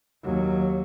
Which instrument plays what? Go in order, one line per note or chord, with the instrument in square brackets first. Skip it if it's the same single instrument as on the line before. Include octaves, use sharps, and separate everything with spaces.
[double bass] D#2 F#3